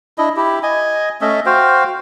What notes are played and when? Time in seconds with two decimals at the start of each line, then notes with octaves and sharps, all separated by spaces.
0.18 D4 E4 D#5
0.36 E4 G4
0.63 D#5 G#5
1.21 A3 C#4 D#5 E5
1.46 F#4 C5 F5 G5